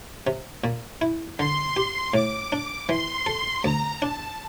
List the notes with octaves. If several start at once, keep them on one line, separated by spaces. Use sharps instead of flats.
C3
A#2
E4
D3 C6
G4
A2 D6
D4
E3 C6
A4
D2 A#5
D4 A5